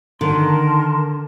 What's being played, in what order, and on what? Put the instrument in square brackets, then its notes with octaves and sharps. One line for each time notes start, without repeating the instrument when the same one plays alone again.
[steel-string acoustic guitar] D3 [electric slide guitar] D#3 [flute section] A#4 A5 C6